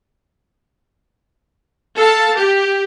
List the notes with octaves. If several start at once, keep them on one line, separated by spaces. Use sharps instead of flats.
A4 F5 A5
G4